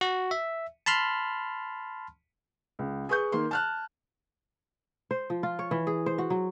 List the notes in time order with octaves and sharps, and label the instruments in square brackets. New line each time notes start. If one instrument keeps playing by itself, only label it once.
[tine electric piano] F#4
E5
A5 B5 C6 F6
[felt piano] C#2
G#4 B4 C#6 G6
D#3 A#3 C6
A5 F6 F#6
[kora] C5
F3
F4
C#5
E3
G#4
C5
F#4
F#3